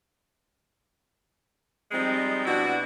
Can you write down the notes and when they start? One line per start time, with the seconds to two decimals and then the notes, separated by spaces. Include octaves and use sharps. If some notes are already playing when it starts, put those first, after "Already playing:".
1.92 F3 G3 G#3 C4 D#4
2.46 B2 D4 E4 F#4